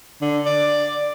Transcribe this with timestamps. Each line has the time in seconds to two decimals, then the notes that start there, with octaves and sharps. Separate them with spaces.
0.21 D3
0.46 D5